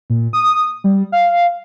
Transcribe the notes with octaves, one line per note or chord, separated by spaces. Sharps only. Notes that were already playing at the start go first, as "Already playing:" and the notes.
A#2
D#6
G3
F5